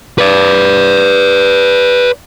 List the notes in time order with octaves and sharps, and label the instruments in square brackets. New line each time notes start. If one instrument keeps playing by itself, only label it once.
[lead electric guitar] B4 D5